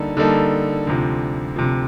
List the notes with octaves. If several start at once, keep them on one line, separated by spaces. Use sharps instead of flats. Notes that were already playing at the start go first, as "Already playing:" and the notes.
Already playing: D3 G3 A#3 D#4 A4
D3 G3 A#3 D#4 A4
D2 C3 F3
D2 C3 F3